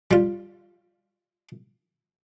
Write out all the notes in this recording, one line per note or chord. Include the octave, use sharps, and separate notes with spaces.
G3 F4